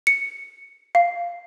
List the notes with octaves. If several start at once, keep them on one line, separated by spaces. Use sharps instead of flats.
C#7
F5